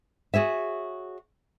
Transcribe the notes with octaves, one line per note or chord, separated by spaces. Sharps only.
F#4 G#4 C#5 E5